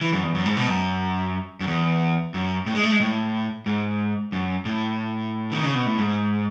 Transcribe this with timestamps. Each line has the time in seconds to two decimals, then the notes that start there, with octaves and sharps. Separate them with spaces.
0.01 E3
0.12 F#2
0.23 E2
0.35 F#2
0.46 G#2
0.57 B2
0.68 F#2
1.60 F#2
1.67 E2
2.34 F#2
2.66 A2
2.75 G#3
2.83 A3
2.92 G#3
3.00 A2
3.66 G#2
4.32 F#2
4.65 A2
5.52 D#3
5.63 C#3
5.75 B2
5.86 A2
5.98 G#2